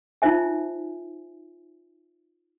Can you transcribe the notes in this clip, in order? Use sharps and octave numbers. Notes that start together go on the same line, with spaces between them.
D#4 F4 C5 E5 G#5